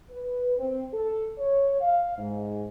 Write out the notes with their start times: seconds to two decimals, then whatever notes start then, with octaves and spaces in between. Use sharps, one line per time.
0.11 B4
0.58 C4
0.94 A4
1.38 C#5
1.81 F5
2.18 G#2